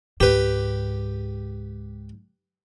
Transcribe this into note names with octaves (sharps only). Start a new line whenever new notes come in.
C#2 G#2 G4 B4